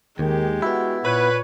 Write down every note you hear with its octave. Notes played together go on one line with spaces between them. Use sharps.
D#2 D#3 G#3 G4
B3 E4 F#4
A#2 B4 C#5